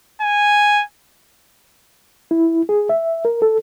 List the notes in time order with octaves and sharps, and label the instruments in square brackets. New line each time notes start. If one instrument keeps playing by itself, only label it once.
[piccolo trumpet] G#5
[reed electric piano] E4
G#4
E5
A#4
A4